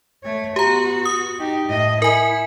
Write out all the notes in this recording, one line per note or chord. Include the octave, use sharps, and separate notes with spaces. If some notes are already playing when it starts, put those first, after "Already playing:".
A3 C#5
B3 F#4 G4 A#5
D#6
D#4 G4
A2 D#5
E4 A#4 G#5